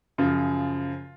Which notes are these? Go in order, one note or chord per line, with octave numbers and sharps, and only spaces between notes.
F#2 C#3 F3 F4